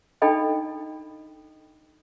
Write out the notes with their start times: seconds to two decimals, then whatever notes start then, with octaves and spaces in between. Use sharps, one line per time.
0.22 D4 D#4 A4 D#5 G5 B5